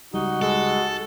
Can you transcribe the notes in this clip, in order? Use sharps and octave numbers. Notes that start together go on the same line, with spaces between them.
C#2 G3 D#4 F#4
G#3 A4